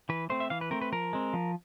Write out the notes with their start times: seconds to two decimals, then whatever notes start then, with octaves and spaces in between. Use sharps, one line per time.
0.09 E3 B4
0.30 A3 C4 C5
0.40 E5
0.50 E3 F5
0.61 B4
0.71 A3 C4 A#4
0.81 B4
0.92 F3 A#4
1.13 G#3 C4
1.33 F3